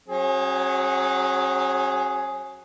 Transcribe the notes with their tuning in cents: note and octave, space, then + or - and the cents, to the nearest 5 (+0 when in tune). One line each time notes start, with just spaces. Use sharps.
F#3 +5 C#4 -45 G#4 +5